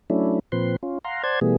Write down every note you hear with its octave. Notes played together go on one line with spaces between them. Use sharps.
F#3 A3 C#4 D4 E4
A#2 F3 C4 B4 C6
C#4 F4
F5 F#5 A#5 C6
C5 D5 F#5 A5 C6 G#6
B2 E3 G3 A3 B3 G#4